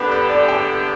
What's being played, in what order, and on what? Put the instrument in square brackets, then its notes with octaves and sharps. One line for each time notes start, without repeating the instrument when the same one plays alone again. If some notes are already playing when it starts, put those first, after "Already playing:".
Already playing: [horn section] D3 B3 G4 [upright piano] B4
[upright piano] B4
D5
G5